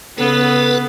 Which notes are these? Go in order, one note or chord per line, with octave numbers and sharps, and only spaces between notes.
C#3 B3 A4 B4